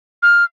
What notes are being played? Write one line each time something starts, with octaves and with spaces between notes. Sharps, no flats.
F6